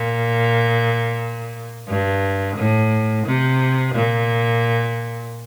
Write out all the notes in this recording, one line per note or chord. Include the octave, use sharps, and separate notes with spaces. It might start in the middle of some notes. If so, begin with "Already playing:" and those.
Already playing: A#2
G2
A2
C3
A#2